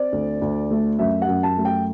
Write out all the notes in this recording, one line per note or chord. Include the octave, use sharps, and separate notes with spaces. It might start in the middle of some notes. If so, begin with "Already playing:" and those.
Already playing: C4 D5
D2
D2
A3
F#2 E5
F#5
F#2
A5
A3
G5